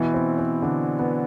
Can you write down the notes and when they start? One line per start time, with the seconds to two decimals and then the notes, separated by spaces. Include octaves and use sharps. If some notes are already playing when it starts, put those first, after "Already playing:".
Already playing: B2 E3 E4
0.14 C4
0.38 C4
0.62 D3 D4
0.99 B3